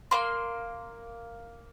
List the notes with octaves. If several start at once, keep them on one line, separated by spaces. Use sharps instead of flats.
A#3 C6